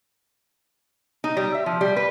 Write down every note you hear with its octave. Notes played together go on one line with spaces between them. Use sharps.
D#4
G3
E5
F3
G3
B4